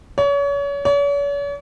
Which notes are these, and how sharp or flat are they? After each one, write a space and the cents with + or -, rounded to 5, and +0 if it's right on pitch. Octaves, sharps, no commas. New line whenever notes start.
C#5 +35
C#5 +45